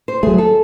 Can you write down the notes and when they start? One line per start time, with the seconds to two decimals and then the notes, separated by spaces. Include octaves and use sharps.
0.08 C5
0.23 F#3 A3 G#4
0.38 A4